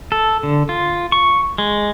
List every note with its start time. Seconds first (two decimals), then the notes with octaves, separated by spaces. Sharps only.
0.12 A4
0.43 D3
0.69 F4
1.12 C#6
1.58 G#3